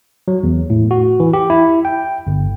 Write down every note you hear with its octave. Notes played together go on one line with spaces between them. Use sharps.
F#3
E2
A2
F#4
E3
G4
E4
G5
G1